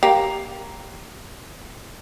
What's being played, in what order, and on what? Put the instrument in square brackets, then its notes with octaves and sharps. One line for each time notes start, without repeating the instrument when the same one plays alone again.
[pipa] A#3 [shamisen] G4